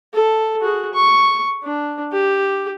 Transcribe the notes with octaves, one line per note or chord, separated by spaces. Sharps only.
A4
F#4 G#4
C#6
D4
G4